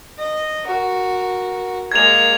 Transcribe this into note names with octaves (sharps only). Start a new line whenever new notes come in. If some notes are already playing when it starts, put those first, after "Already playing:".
D#5
F#4 A#4
G#3 A#3 G#6 F7